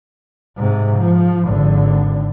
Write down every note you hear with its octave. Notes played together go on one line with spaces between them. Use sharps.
G#2 C3
F3
G#1 D3